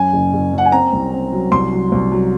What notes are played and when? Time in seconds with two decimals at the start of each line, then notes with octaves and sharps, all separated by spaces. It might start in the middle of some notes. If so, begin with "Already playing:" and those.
Already playing: F#2 G#5
0.13 F#1
0.33 F#1
0.53 F#2 F#5
0.65 G#5
0.72 C4 A#5
0.92 C2
1.12 C4
1.32 F#3
1.51 C2 C6
1.72 F#3
1.92 C2
2.12 F#3